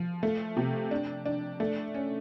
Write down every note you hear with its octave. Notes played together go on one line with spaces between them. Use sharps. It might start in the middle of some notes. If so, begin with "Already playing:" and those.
Already playing: F3
A3
C3
D4
D4
A3
C#4